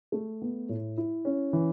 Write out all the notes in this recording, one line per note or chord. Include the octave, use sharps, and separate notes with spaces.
A3
B3
A2
E4
C#4
E3